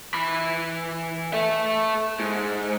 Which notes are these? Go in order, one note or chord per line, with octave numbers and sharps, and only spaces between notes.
E3 B5
A4 E5
G#2